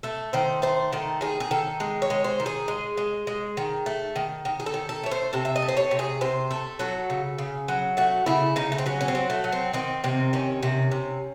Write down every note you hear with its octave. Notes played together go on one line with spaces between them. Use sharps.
A3 A4
D#3 C5
A3 C5
D#3 A4
D#3 G#4
G#4
D#3 A4
G#3
C#5
G#3
C5
D#3
G#4
G#3
G#3
G#3
D#3
A3
D#3
D#3
G#4
A4
D#3
A4
A3 C#5
C5
C3 A4
E5
D#5
A3
C5
C#5
C3
G#4
C3 C5
A3 A4
F#3 A4
C#3
C#3
F#3
A3 F#4
C#3 E4
C#3 D#4
A3
C4
F#3 C#4
C#4
C4
F#3
A3
F#3
C4
D#3 C4
C3 C4
D#3 C#4
C3
C3